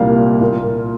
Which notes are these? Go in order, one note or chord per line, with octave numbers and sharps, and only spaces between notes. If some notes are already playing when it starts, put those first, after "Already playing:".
Already playing: C2 A#2 G3 A#3 F5
A#2 A#3